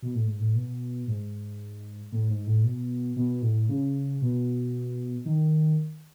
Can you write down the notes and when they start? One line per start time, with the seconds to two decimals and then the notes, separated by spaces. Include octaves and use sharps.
0.02 B2
0.15 A2
0.27 G#2
0.40 A2
0.55 B2
1.07 G#2
2.12 A2
2.30 G#2
2.47 A2
2.64 B2
3.16 B2
3.42 A2
3.69 C#3
4.22 B2
5.25 D#3